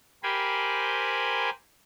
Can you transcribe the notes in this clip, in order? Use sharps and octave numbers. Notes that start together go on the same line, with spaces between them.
G4 A#4 C5 G#5 B5